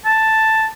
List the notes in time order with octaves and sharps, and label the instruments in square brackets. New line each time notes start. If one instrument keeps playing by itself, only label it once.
[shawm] A5